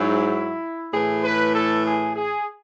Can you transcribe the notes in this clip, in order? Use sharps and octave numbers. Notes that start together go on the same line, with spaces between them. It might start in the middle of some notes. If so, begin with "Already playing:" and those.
Already playing: G#2 F#3 E4
A2 E3 G#4
B4
A4
G#4
G#4